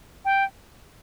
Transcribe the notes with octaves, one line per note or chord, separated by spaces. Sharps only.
G5